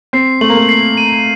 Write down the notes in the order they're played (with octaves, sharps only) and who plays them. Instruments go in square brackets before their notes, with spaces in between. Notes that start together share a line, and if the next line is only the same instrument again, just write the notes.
[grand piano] C4 [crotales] C7
[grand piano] A3 [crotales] F#7
[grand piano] A#3
A3
[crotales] C7
D#7